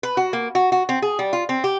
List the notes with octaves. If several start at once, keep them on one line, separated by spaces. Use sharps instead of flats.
B4
F#4
A#3
F#4
F#4
C4
G#4
G3
F4
C4
G4